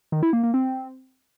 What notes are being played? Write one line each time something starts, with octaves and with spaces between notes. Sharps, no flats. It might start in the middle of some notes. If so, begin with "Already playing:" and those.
D#3
E4
A#3
A#3
C4